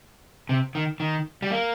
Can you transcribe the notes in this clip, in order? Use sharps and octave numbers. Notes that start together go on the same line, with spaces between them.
C3
D#3
D#3
G3
A#3